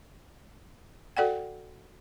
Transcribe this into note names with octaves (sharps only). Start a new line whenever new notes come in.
F#4 A4 D5 F#5 G5